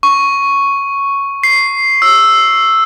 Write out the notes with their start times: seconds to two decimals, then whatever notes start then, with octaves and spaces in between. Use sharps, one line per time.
0.03 C#6
1.44 C7
2.02 E6